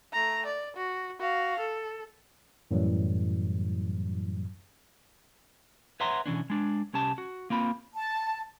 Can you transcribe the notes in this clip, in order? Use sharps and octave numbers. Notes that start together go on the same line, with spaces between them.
A3 A#5
D5
F#4
F#4 F5
A4
F#2 A2 E3 F#3 G3
B4 C#5 E5 F#5 A#5 C6
B2 E3 C#4 D4
G#3 D4
C2 C#4 G4 A5
F#4
A#3 C4 F4 B5
A5